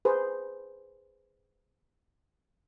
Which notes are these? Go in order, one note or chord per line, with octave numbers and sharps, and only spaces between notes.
G#4 B4 C5